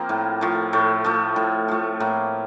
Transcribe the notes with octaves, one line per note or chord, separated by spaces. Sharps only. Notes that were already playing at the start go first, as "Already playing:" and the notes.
Already playing: F3 A#3 C4
A2
F3 A3
A2 A3
F3 A3
A2
F3 A3
A2 A#3